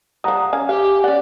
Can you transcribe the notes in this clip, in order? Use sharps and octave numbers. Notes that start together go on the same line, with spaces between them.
F3 G3 F#5 A#5 D#6
C#4 F5 G#5
G4 F5
C#4 D5 F#5